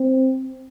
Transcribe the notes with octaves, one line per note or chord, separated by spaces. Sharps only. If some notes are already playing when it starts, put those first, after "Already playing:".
Already playing: C4